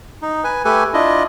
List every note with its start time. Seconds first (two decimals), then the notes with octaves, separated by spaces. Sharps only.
0.22 D#4
0.44 B4 G#5
0.65 A3 G4 A4 B4 G#5
0.94 D4 E4 F4 D#5